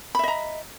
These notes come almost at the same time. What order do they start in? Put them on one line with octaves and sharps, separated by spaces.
B5 E5 D#5 A#5